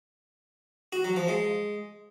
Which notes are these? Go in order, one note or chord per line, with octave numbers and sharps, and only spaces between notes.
F#4
F#3
F3
G#3